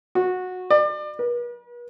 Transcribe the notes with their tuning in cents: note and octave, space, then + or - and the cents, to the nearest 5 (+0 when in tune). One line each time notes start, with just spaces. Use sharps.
F#4 -15
D5 +35
B4 -45